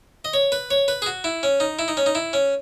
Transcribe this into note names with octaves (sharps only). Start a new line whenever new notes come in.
D#5
C#5
B4
C#5
B4
G#4
F#4
E4
C#4
D#4
E4
D#4
C#4
D#4
E4
C#4